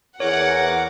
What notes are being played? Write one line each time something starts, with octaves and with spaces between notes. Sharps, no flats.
E2 A#4 C#5 F#5 A#5 D6